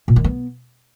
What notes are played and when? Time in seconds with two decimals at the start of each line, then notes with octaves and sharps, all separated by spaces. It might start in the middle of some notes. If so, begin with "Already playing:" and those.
0.08 A#2
0.16 D#3
0.24 B3